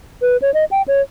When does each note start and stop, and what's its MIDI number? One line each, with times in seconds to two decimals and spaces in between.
0.22 0.37 71
0.42 0.53 73
0.54 0.65 75
0.71 0.82 79
0.88 1.01 73